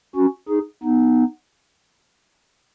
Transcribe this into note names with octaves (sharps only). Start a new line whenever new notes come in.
C#4 F#4
D#4 G#4
B3 D#4